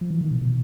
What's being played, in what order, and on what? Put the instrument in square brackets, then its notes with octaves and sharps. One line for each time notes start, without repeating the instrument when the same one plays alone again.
[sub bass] F3
E3
D#3
B2
B2